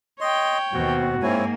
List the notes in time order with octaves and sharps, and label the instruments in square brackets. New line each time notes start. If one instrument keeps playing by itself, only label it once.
[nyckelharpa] C#5 G5 [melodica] D#5 C6
[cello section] D#2 B2 [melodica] C4 [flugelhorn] F#4
[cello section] G#2 A#3 [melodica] C4 E4 C#5 [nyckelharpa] G#5